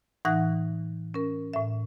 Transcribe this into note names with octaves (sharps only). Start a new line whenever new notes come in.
A2 E3 D#4 F#5 F#6 A#6
C#4 A#4
A2 E5